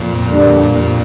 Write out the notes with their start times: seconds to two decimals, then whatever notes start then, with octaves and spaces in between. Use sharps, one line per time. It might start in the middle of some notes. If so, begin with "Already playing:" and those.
Already playing: F2 A#2
0.30 D3 G3 A#3 D4